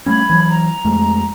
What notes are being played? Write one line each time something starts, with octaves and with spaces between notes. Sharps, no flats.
G3 A3 C#4 B5 G#6
E3 F#3
A#5
F2 G#3 A3